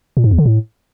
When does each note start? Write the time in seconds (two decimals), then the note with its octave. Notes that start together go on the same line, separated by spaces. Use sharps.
0.17 A#2
0.24 G#2
0.31 E2
0.38 D3
0.46 A2